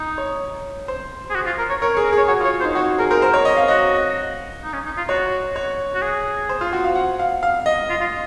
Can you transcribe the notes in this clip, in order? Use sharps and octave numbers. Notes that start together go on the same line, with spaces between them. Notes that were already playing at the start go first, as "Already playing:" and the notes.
Already playing: D#4
C#5
C5
G#4
F#4
F4
A#4
C#5
A#4 C#5
C#5
G#4
A#4
G#4
C#5
F#4 C#5
F4
C#5
C5
D#4
F#4 C#5
G#4 A#4
A#4 C5
A#4 C5
C#5
D#5
F5
F#4 D#5
D#4
C#4
D#4
F4
F#4 C#5
C#5
F#4
G#4
C5
F4
F#4
F5
F#5
F5
F5
D#5
F4
F4